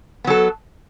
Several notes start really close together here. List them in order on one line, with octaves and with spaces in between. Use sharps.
B3 F#3 A4